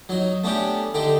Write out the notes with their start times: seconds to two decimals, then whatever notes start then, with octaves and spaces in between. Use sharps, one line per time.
0.09 F#3 D#4
0.44 A3 B3 C#4 D4 G4
0.94 D3 D#4 G4